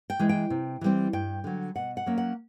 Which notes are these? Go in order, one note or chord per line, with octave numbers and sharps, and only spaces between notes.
G5
E3 G#3
G5
C3
E3 G3 C4
G2 G5
D3 F#3
B2 F#5
F#5
F#3 A#3 C#4
F#5